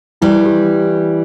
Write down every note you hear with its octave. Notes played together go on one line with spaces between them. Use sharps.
E3 G3 E4
G4